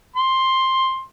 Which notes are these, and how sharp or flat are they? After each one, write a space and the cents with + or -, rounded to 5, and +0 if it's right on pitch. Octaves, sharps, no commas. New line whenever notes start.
C6 +10